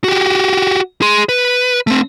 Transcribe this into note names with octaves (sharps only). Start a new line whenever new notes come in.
F#4 G4
G#4 C6
B4
A3 C4